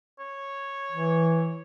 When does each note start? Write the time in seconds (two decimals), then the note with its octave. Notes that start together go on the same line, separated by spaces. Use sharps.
0.19 C#5
0.91 E3